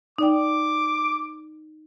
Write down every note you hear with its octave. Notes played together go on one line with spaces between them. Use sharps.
D#4 D5 G5 D6